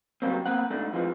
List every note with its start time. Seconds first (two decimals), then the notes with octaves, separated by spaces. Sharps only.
0.22 C#3 F#3 G3 A3 A#3 C4
0.46 A#3 C4 F#5
0.70 G#2 A3 D4
0.93 F2 E3 F3 G#3